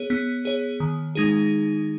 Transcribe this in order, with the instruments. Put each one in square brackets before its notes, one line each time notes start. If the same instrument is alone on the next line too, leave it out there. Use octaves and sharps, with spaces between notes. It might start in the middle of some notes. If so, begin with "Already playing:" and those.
Already playing: [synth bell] B3 G#4 C#5
B3
G#4 C#5
D#3
G#3 D#4 G#4